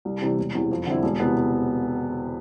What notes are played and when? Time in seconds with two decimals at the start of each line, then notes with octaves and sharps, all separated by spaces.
0.05 C2
0.22 C3 E3 G3
0.38 E1
0.55 E2 C3 E3
0.71 F2
0.87 D3 G3 C4 E4
1.03 E1
1.20 C3 E3 B3